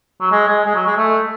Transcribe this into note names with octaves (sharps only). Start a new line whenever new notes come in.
F#3
G#3
G#3
G#3
F#3
G#3
A3